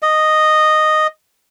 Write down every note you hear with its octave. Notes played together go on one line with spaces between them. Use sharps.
D#5